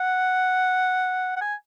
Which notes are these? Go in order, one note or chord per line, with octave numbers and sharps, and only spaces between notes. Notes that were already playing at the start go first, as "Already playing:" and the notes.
Already playing: F#5
F#5
G#5